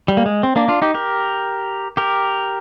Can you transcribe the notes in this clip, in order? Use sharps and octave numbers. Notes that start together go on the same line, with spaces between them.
G3
A#3
G#3
C4
A#3 D4
D4 F4
D#4 G4
G4 A#4
G4 A#4